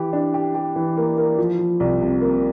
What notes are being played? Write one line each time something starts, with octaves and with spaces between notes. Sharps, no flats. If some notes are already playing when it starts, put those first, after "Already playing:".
Already playing: E3 G4
D4
G4
G4
E3
A#3
A#3
F3
F3
C2
C3
A#3